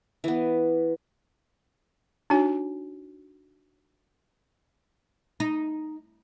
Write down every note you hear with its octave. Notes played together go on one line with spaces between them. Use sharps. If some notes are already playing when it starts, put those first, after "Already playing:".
E3 B3
D4 D#4 F#4 C#5 G#5
D#4